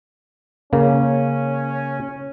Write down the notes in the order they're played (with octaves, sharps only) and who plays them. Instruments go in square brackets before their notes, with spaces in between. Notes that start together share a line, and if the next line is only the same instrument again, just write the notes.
[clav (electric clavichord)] C#3 A#3 [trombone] C#4